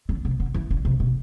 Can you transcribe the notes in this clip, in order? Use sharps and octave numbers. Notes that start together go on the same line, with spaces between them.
D3
C3
D3
E3
D3
C3
B2